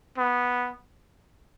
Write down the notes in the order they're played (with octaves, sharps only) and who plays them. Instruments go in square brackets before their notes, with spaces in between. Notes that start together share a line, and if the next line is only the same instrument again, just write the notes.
[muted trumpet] B3